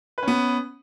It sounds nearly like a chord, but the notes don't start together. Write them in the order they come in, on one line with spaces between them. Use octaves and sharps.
B4 C#4 B3